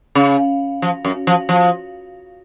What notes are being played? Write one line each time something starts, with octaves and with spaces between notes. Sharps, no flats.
C#3
F3
F#2
F3
F3